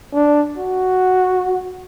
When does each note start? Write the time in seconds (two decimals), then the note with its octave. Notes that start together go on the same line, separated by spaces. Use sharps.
0.13 D4
0.58 F#4